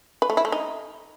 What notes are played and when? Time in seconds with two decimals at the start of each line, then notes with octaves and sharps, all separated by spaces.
0.22 B4
0.30 A3
0.37 E4
0.45 A3
0.52 D#4